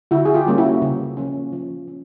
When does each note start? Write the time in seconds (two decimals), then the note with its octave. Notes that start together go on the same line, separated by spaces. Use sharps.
0.11 D3 E4 F#4
0.25 G#4
0.34 F4 G4
0.47 G3 A#3 C#4
0.58 E4 F#4
0.82 C#3
1.17 F3 A#3 C#4
1.52 F3
1.88 C#4